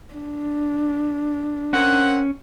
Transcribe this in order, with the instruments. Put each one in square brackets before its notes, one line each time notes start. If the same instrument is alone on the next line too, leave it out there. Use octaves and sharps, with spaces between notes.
[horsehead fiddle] D4
[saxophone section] A#3 C4 F#5 [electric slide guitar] C#4